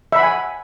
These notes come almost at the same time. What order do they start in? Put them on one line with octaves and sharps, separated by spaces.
E5 B5 F#5 G#5